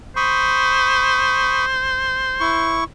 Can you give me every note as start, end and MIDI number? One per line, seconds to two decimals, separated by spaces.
0.16 2.81 72
0.16 1.65 83
0.16 1.65 85
0.16 1.65 87
2.40 2.84 64
2.40 2.84 85